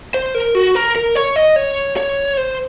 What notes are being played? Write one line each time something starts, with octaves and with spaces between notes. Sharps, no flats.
C5
A#4
F#4
A#4
A#4
C#5
D#5
C#5
C#5
C5